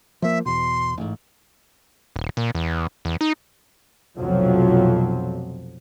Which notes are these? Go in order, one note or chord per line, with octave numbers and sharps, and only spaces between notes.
F3 A#3 E5
E2 B2 C6
A1 G#2
D#1
A#2
E2
E2
D#4
F1 B1 F2 F3 F#3